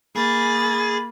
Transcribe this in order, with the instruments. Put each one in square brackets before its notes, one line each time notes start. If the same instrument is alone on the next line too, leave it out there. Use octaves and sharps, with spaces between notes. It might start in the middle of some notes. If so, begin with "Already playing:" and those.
[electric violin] A#3 A6 [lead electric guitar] G#4 [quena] B5